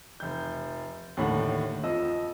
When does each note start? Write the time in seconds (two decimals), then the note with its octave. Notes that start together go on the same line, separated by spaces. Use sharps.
0.20 F1 G6
1.17 D#2 A2 D3 F#5
1.83 F2 F3 D#5 E6